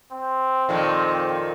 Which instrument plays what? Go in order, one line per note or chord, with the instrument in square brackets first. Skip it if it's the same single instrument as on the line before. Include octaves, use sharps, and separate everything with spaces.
[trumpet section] C4
[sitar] F2 A#2 D#3